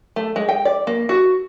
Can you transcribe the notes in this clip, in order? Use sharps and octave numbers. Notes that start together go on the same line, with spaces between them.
A3
G#3
G5
D5
A#3
F#4